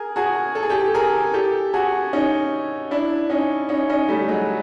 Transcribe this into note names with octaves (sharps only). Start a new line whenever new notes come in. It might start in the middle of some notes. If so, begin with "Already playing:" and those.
Already playing: G#4 A#4
F#4 G#4
A4
G#4
G4 A4
G#4 A#4
G4 A4
F#4 G#4
C#4 D#4
D4 E4
C#4 D#4
C#4 D#4
C#4 D#4
G3 A3
F#3 G#3